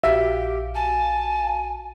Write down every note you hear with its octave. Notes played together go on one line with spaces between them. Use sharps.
A#1 F#4 G4 E5 F5
G#5 A5